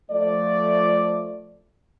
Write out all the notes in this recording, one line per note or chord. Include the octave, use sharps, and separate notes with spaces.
F3 A3 D5